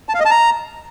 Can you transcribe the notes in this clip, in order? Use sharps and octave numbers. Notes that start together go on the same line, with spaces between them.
A5
F5
D#5
A5
A#5